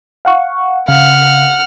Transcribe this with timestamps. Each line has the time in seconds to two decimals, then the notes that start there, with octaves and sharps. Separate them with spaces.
0.25 F5 F#5 C#6
0.88 C#3 F5 F#5 F6